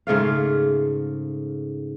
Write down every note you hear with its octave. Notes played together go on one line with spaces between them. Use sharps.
G#2 C#3 A3 F5